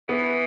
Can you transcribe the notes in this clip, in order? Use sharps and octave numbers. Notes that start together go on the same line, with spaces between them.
E3 B3